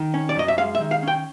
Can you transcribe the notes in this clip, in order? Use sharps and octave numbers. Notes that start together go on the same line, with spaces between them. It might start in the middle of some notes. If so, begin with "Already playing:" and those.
Already playing: D#3
C#4
D5
F#2 D#5
E5
G#3 F5
E5
D#3
F5
C#4 G5